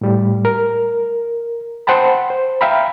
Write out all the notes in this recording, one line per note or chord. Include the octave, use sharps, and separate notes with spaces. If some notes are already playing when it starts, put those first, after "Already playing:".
A2 G3
A#4
C5 F#5 G5 A5 B5
C5
E5 F5 G5 A#5 B5